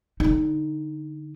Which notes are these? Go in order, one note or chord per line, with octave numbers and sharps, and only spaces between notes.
D3 D#4